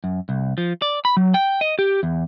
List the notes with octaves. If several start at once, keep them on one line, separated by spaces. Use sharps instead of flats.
F#2
C2
F3
D5
B5
F#3
G5
D#5
G4
E2